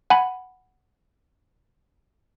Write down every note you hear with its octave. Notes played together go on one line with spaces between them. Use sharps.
F#5 G#5 B5